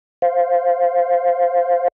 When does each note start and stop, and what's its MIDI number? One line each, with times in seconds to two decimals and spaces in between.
0.22 1.88 72
0.22 1.88 77